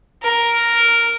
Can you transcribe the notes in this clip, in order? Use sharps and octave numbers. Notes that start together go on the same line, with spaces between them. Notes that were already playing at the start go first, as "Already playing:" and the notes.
A#4